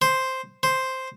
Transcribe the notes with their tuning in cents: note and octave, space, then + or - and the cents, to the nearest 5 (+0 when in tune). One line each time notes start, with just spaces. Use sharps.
C5 +0
C5 +0